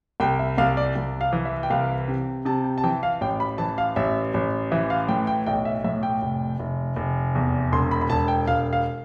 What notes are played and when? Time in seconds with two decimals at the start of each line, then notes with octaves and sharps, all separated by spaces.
0.20 C2 G5
0.39 E5
0.58 C2 F5
0.77 D5
0.96 C2
1.21 F5
1.33 E3
1.45 E5
1.63 G5
1.70 C2 F5
2.08 C3
2.45 C3 A5
2.64 G5
2.78 A5
2.84 E3 G5
3.03 F5
3.21 A1 G5
3.40 B5
3.58 E3 A5
3.78 F5
3.96 A1 E5
4.34 A1
4.72 E3 E5
4.90 F5
5.08 A2 G5
5.27 G5
5.46 B1 G5
5.65 E5
5.84 A2 E5
6.03 G5
6.22 F1
6.59 F1
6.96 F1
7.35 E2
7.72 E1 C6
7.91 B5
8.01 B5
8.10 E1 A5
8.28 G5
8.48 E1 F5
8.73 F5